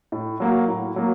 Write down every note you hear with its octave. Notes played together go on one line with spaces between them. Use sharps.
A2
F#3 A#3 F#4
A2
F#3 A#3